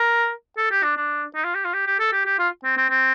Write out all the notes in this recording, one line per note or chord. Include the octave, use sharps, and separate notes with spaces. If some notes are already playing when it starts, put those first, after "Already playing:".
Already playing: A#4
A4
G4
D4
D4
D#4
F4
G4
F4
G4
G4
A4
G4
G4
F4
C4
C4
C4